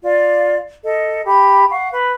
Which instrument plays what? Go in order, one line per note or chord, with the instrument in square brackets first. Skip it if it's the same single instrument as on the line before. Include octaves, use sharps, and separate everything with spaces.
[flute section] F4 D5
A4 D#5
G4 B5
F5 F#5 C#6
B4